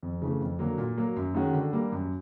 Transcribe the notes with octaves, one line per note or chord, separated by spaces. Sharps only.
F2
C#3 E3 A3
F2
D3 F#3 A#3
A#2
F#3 A#3
F#2
D#3 G#3 C#4 F#4
D3
G3 A#3
F#2